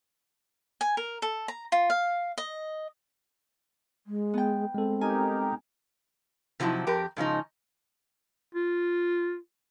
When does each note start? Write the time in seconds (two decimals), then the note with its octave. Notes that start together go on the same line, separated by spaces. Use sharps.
0.81 G#5
0.97 A#4
1.22 A4
1.48 A#5
1.72 F4
1.90 F5
2.38 D#5
4.07 G#3
4.34 B3 G5
4.74 G#3 C4 A4
5.01 D#4 G4 A#4 G#5
6.60 C3 F3 F#3 D#4 E4
6.87 F2 G4 A#4
7.17 G#2 C#3 F3 D#4
8.54 F4